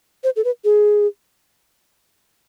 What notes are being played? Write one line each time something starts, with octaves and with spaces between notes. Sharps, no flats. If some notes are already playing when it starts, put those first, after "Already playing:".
C5
A4
B4
G#4